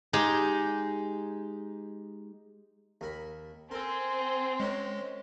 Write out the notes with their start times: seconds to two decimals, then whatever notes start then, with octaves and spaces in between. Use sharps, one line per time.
0.13 G#3 D#4 G4
3.01 D#2 A#4 B5
3.71 C4 A4 A#4 G#5 C6
4.60 G#3 C#4 F#4 A#4